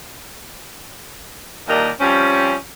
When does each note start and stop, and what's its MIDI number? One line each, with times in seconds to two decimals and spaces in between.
1.68 1.90 39
1.68 1.90 46
1.68 1.90 55
1.68 1.90 62
1.68 1.90 70
1.68 1.90 75
2.00 2.55 53
2.00 2.55 55
2.00 2.55 60
2.00 2.55 61